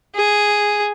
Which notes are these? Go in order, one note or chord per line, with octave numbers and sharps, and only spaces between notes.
G#4